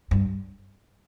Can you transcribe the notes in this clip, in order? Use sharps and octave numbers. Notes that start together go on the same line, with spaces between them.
G2